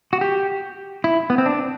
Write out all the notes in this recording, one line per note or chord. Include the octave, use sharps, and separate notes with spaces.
F#4
G4
E4
B3
C4
D4